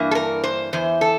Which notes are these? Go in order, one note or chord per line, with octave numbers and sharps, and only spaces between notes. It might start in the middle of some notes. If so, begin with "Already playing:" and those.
Already playing: G2 E3 A#3
A4
A#4
C5
E2 E3 C5
A4